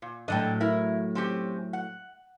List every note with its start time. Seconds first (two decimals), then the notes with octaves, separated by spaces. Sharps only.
0.02 A#2
0.28 A2 F#3 D4 A4 D#5 G5
0.60 E4 A#4
1.15 C4 C#4 G4
1.73 F#5